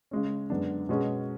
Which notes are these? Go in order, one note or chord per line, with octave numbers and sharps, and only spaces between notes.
C#3 G#3 C#4
F#2 D3 G#3 B3 D4
B2 G#3 C#4 G#4